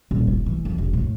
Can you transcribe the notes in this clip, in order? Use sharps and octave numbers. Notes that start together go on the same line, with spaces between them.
D#1
A2
E3
F2
E1
A2